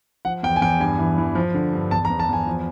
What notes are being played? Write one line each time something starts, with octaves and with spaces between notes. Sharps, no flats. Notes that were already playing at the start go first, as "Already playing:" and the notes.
F3 F#5
E2 G5
G#5
E2 G5
G2 G#5
E3
E3
F3
D3
G2
E2 A5
A#5
E2
A5
E2 G#5
F3